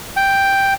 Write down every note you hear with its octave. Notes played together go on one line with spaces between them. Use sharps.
G5